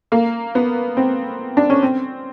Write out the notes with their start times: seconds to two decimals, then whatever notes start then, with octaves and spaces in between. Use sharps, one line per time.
0.12 A#3
0.55 B3
0.97 C4
1.57 D4
1.70 C#4
1.83 C4